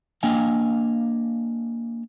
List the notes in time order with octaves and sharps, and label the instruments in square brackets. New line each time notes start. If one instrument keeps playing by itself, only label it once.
[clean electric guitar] A#3 D4 D#5 F5 G5 G#5